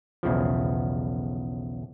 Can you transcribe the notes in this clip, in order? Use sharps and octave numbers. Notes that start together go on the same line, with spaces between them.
B1 E2 C#3 F3